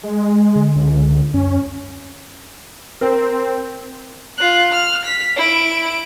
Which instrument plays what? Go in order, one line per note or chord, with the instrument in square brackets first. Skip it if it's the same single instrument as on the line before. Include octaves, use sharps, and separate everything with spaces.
[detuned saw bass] G#3
[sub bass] D3
[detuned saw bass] C#2
[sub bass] F#2 [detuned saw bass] C#4
[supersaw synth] C4 [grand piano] A#4
[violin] F4 F#6
F6
B6
E4 D7